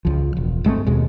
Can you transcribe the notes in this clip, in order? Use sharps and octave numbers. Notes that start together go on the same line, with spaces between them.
C#2 F3
E1
G1 G#3 A3 C4
D#2 B2 G#3